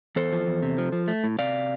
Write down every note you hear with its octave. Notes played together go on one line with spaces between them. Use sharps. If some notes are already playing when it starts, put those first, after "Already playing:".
E2 A4 C5
F3
E2
C3
F3
F3
A3
A2
C3 D5 F5